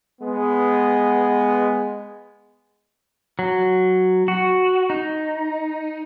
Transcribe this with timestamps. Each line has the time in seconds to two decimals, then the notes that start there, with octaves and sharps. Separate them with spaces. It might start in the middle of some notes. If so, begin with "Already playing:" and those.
0.21 G#3 B3
3.39 F#3
4.28 F#4
4.90 D#4